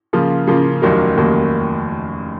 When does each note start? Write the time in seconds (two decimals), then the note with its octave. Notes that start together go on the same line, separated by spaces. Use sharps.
0.13 C#3 F3 A#3 F4
0.47 C#3 F3 A#3 F4
0.82 F1 D#2 D#3 F#3 A#3
1.17 F1 D#2 D#3 F#3 A#3